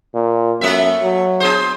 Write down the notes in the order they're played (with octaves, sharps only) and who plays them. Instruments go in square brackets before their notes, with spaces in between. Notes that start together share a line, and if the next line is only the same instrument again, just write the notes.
[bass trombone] A#2
[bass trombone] F#2 [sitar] A3 A#3 E5
[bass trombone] F#3
[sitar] B3 G#4 C5